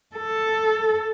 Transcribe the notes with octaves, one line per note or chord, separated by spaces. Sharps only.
A4